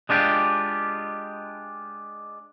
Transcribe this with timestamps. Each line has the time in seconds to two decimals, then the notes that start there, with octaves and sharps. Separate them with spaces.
0.09 G#3 D4 F4 G4